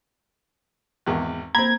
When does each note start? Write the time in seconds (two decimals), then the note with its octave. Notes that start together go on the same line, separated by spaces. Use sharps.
1.06 G#1 E2
1.55 A#3 C4 A#5 B5 G#6